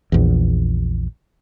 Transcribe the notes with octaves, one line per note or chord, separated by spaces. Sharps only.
A#1 E2